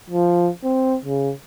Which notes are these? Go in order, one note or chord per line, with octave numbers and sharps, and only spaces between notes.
F3
C4
C#3